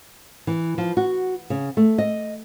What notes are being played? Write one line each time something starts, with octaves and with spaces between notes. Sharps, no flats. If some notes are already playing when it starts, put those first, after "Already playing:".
E3
F3
F#4
C#3
A3
D#5